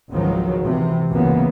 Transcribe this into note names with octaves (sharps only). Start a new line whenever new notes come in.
G#1 C#2 D#3 F3 F#3
C3 E3
C#2 F#2 C#3 E3 A#3 B3